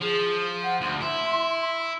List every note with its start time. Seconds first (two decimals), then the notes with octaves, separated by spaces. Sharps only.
0.01 F3 G#4
0.64 F#5
0.81 D2 C6
1.01 E4